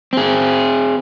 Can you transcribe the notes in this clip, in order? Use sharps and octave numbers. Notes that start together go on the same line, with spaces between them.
C4 G#4